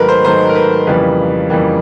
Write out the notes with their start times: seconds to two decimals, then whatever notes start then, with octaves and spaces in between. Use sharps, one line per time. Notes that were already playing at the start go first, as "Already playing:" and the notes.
Already playing: G#2 D#3 F#3 A3 A#4 B4
0.08 C5
0.24 G#2 D#3 F#3 A3 C5
0.49 A#4
0.55 B4
0.87 F2 C#3 E3 G3 A#3 B4
1.49 F2 C#3 E3 G3 A#3